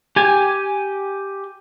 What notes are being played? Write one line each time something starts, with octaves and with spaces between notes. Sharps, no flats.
G4 G#5